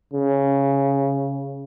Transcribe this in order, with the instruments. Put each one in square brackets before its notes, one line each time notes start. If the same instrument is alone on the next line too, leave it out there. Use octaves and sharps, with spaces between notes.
[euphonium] C#3